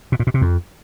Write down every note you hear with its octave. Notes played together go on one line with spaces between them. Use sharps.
B2
A#2
B2
C3
F2